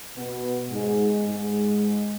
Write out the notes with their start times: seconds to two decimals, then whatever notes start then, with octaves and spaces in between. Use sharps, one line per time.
0.16 B2 B3
0.70 G#2 G#3
1.25 G#2 G#3